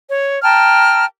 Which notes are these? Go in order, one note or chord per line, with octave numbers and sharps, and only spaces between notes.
C#5
G5 A5 A#5 F6